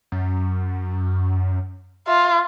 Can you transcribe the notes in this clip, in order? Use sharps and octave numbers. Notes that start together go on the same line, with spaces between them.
F#2
F4 E5